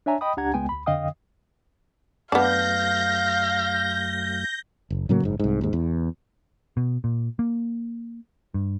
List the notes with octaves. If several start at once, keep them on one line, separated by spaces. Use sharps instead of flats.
D4 C#5 E5 G#5 A#5
D#5 G5 B5 D#6
C#2 D4 G4 F#5 A#5 G#6
C#2 G#3 B3 G5 G#5
D2 B5
F2 D3 D#5 F5 G5 D#6
F#2 F#3 A3 B3 D4 F5 G6 A#6
F#1
A2 C#3 F#3 A#3
F#1 G#2
C2 G#2
D#2 G#2
E2
B2
A#2
A#3
G2